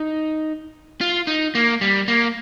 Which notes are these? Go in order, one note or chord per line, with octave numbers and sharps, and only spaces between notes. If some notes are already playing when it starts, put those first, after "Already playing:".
Already playing: D#4
F4
D#4
A#3
G3
A#3